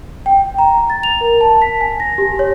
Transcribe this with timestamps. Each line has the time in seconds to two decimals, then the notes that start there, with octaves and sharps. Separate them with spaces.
0.26 G5
0.58 A#5
0.90 A6
1.03 F7
1.21 A#4
1.41 A5
1.62 B6
1.81 G#5
2.00 A#6
2.18 G4
2.39 C#5